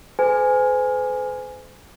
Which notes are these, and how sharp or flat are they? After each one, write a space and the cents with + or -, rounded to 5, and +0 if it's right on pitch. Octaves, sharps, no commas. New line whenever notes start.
A4 -35 C5 -45 G#5 +0